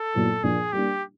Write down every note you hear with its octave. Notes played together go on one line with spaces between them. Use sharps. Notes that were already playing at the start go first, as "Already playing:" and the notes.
Already playing: A4
A#2 F#3 B3 E4
A#2 F3 A#3 D4 G#4
G3 A#3 D4 G4